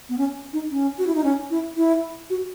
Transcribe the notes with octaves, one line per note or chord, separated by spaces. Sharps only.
B3
C#4
D#4
C#4
F#4
E4
D#4
C#4
E4
E4
F#4